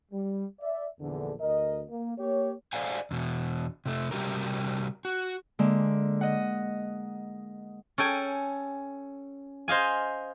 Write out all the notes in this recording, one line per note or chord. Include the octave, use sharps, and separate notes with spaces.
G3
D5 E5
A#1 E2 D3
D2 A#4 D#5
A#3
A#3 G4 C#5
A4 C5 D5 F5 F#5 G#5
E2 B2
C3 A3
C3 G3 F#4 G4 A#4
F#4
D3 G#3 A#3
D#5 F#5
C#4 A4 G5 G#5
C5 D#5 F5 G#5